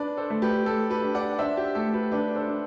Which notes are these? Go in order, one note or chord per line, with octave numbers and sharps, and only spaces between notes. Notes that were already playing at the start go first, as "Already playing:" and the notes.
Already playing: D4 B4 D5
A4 C5
A3
G4 B4
A3 A4
G4 B4
D4
D5 F#5
D4 C5 E5
G4
A3 A4
G4 B4
D4 G4 B4
A4 C5
D4